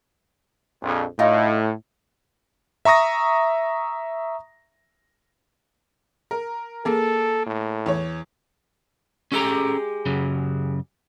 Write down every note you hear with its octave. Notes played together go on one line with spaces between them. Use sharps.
A#1 F2
A2 D#4 F4 A#5
E5 A#5 C#6 D#6 A#6
A#4
A#3 G#4 A4
A2
E2 C#5
G#3 C#4 G4 A4 A#5
F#2 C#3 F#3